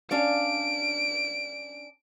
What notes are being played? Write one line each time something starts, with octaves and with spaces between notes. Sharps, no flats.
C#4 D4 F5 D7